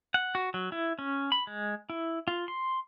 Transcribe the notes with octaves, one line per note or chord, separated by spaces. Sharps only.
F#5
F#4
F#3
E4
C#4
B5
G#3
E4
F4
C6